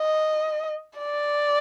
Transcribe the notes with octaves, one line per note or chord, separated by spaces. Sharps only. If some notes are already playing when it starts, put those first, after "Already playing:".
Already playing: D#5
D5